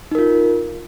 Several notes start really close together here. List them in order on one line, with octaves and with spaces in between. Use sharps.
D#4 A#4 F4